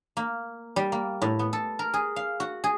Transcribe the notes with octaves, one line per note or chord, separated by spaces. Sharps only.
A#3
G3
A#3
A2
B3
A4
A#4
G#4
F5
F#4
G#4